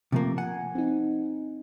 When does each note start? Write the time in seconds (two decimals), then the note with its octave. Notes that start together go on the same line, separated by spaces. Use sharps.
0.12 C3 F3 A3 A#3
0.38 F#5 G#5
0.75 C4 D#4